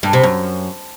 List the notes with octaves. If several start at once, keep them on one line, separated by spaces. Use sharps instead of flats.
G2
C3
F#2